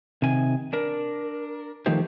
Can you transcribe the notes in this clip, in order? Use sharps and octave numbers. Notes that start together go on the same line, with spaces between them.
C3 D#3 G#5
D4 A#4
D#3 F3 A3 D#4 G4 C5